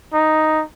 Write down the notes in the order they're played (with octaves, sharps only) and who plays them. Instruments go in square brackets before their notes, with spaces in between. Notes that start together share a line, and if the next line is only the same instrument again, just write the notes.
[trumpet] D#4